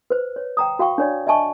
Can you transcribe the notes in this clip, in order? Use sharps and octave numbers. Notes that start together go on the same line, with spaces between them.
B4 C5
C#5
G5 A#5 D#6
F#4 F5 G5 C#6
D4 C#5 D5
D#5 E5 G#5 A5 C#6